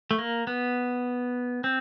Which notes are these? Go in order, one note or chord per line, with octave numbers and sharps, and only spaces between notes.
A3
A#3
B3
C4